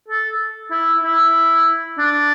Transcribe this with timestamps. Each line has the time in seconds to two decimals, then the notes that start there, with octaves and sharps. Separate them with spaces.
0.09 A4
0.71 E4
1.04 E4
1.98 D4